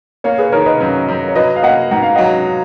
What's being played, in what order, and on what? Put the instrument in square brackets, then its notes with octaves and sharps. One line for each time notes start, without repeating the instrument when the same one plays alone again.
[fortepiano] A#3 [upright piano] C#5 F5
[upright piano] G#4 B4
[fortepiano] D#3 [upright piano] A#4 C#5
[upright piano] B4 D#5
[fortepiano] F#2
F#2
[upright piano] C#5
[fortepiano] F#3 [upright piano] B4 D#5
[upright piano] F5
[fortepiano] A#3 [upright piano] D#5 F#5
[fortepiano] G#2 [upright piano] F#5
[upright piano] F5
[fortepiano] F#3 [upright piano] D#5 F#5